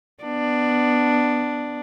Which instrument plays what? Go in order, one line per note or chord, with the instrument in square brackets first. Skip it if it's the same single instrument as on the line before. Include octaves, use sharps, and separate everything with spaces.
[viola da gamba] B3 D4